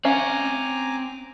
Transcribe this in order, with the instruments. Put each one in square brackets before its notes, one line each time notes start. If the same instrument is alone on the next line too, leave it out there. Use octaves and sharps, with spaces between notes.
[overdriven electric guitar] C4 F#5 [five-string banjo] C#4 F5 [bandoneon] G#5 A#5 D6